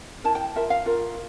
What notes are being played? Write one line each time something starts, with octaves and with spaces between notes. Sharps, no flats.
E4 A#4 A5
G5
F4 A#4 E5
F5
F4 A#4